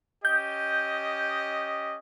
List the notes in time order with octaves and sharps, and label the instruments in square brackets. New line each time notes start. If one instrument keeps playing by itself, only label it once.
[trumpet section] C#4 G4 D#5 [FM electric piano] G6